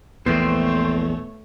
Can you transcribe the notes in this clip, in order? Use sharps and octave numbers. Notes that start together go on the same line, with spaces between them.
A#1 E2 A3 B3 C4 C5 C#5